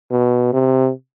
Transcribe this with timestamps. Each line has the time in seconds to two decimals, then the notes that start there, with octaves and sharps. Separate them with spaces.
0.11 B2
0.53 C3